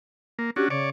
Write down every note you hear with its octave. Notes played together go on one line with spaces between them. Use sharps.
A#3
C#4 D4 F#4 G4
C#3 C#5 D5